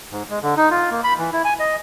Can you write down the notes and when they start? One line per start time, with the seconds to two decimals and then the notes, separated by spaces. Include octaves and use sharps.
0.12 G#2
0.30 G#3
0.42 D3
0.57 D#4
0.71 F4
0.91 A#3
1.04 B5
1.18 E3
1.32 E4
1.45 G#5
1.59 D#5